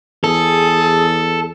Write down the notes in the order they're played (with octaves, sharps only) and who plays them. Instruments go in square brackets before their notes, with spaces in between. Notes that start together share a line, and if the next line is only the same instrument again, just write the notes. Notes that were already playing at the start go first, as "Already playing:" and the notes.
[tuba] E2 [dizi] G#4 [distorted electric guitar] A4